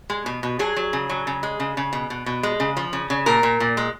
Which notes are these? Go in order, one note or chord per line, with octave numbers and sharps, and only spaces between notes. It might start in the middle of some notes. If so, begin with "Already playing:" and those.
G#3
B2
B2
F#3 G#4
F#3
C#3
F#3
C#3
G#3
C#3
C#3
B2
B2
B2
G#3
C#3
F3
C#3
C#3
A#2 A#4
A#2
A#2
G#3